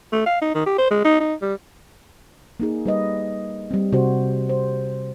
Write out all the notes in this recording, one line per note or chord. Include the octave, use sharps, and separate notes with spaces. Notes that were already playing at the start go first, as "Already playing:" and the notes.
A3
F5
D#4
D#3
G4
C5
G#3
D#4
D#4
G3
A#3 D#4 G#4
G3 B4 D#5
G3 C4
C3 F#4 C5
C5